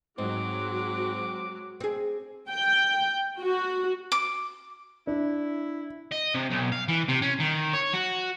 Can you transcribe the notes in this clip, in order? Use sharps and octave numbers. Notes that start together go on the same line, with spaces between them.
G#2 F#3 G#3 C4 F#4 D6
C4 G#4
G5
F#4
D6
D4 E4
D#5
C3
B1
F5
E3
C3
C#4
D#3
C#5
F#4